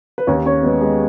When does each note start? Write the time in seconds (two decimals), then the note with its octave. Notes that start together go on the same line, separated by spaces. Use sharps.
0.18 B4
0.27 D#2 C#4 C#5
0.45 C#4 C#5
0.63 G#3 B3 B4
0.81 G#3 G#4